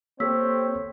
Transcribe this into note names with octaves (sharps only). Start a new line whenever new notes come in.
A#3 C4 G4 A4 C#5 E6 B6